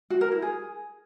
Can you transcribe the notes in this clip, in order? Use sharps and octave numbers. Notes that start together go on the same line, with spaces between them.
F#4
A#4
E4
G#4